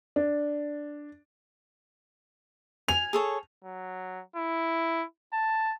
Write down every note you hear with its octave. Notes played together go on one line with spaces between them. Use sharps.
D4
G#5 F7
G#4 A4 C#5
F#3
E4
A5